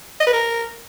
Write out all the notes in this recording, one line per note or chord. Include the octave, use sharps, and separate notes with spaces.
D#5
B4
A#4